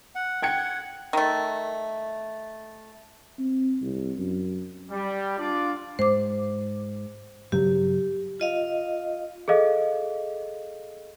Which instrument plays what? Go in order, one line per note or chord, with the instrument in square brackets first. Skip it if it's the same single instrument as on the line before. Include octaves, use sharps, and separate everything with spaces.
[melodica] F#5
[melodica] F#5 [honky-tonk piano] G5 G#6 C#7
[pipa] D#3 A3
[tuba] C4
C2
F#2
[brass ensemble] G3
D4 F4 D5
[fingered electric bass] G#2 [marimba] C5 D6
[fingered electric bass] G2 C#3 F#3 [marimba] G4
[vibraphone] F4 D#5 F5
[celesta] G#4 A4 D#5 F5